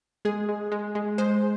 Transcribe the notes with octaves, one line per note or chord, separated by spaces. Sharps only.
G#3 G#4
G#3
G#3
G#3
G#3 C5